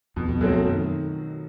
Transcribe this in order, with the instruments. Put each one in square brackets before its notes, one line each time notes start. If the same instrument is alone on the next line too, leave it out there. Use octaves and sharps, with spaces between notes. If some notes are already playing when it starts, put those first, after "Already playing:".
[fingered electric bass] F2 [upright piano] B2
[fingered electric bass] F2
[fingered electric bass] F#2 [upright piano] F#3 A3 C4
[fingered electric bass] F#2
[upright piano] D#3